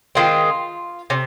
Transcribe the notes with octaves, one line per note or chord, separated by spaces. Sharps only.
D#3 G#3 C4 F4
C3 C#4